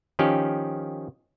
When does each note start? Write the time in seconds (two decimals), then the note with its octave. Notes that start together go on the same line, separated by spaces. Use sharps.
0.19 D#3 F3 C#4 G4